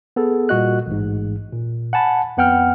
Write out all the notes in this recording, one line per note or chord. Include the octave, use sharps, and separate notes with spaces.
B3 G#4 A4
A#2 G3 F#4 D#5 F#6
A1 G#2
A#2
F#5 G#5 A5 B5
F2 B3 F#5 G5 F6